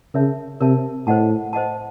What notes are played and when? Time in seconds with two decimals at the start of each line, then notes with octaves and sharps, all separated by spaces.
0.14 C#3 A#4 C#5 E5 A5
0.60 C3 A#4 C#5 E5 A5
1.07 A2 C5 D#5 F#5 A5
1.53 C5 D#5 F#5 A5